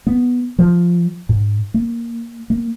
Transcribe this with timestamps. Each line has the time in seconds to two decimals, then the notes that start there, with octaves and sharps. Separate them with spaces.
0.07 B3
0.59 F3
1.29 G#2
1.74 A#3
2.50 A#3